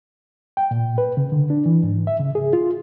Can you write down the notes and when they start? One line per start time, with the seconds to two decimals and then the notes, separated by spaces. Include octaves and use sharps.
0.57 G5
0.71 A#2
0.98 B4
1.17 C#3
1.32 D3
1.50 D4
1.66 E3
1.83 G#2
2.07 E5
2.19 C#3
2.35 G#4
2.53 F4